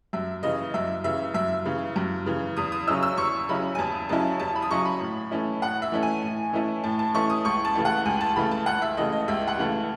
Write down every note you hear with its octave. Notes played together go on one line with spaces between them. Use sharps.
F#2 E5
C#3 E3 D#5
F#2 E5
C#3 E3 E5
F#2 E5
C#3 E3
F#2
C#3 E3
E2 D#6
D#6
C#3 F#3 C#4 E4 E6
E6
E2 C#6
C#3 F#3 C#4 E4 B5
G#5
E2 A5
C#3 F#3 C#4 E4 A5
E2 A5
B5
D#6
C#3 F#3 C#4 E4 C#6
B5
A2
E3 A3 C#4 E4
A2 F#5
E5
E3 A3 C#4 E4
G#5
A2
E3 A3 C#4 E4
A2 A5
A5
E3 A3 C#4 E4 C#6
D#6
C#2 C#6
A5
C#3 E3 A3
F#5
C#2 G#5
A5
C#3 E3 A3 B5
A5
C#2 F#5
E5
C#3 E3 A3 D#5
D#5
C#2 E5
F#5
C#3 E3 A3